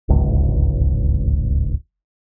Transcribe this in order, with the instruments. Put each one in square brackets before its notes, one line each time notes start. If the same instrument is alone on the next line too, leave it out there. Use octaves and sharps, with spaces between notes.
[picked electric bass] D1 G#1 C#2